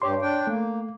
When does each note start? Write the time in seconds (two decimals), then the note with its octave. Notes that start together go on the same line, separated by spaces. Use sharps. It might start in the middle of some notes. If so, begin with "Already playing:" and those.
0.02 G2 G4 C#5 C6
0.22 D4 G5
0.47 A3 A#3